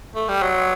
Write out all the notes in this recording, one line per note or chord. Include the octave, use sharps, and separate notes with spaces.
A3
G3
F#3